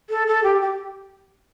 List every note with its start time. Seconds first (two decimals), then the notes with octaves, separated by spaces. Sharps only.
0.10 A4
0.27 A4
0.44 G4
0.61 G4